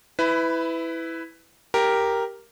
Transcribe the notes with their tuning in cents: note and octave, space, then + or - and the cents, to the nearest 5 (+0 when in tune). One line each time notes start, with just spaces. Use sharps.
E4 -5 B4 +20
G4 +0 A#4 +0